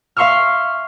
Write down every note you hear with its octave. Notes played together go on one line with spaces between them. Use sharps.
E5 F5 C6 C#6 E6 F6